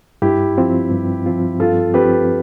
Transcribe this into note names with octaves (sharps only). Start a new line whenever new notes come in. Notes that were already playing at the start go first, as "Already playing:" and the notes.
G2 E4 G4
F3 C4 F4
G2
F3 C4 F4
G2 F4 A4
F3 C4 F4 G4 B4